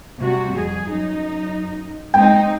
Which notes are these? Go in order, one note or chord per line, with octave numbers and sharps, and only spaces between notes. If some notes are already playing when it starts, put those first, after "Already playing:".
C3 G3 F#4
F2 G#4
F#2 D#4
G#3 C4 D#4 G5